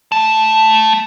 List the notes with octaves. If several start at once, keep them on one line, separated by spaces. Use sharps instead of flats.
A3 A5